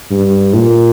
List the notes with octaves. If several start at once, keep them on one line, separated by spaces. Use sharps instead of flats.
G2
A#2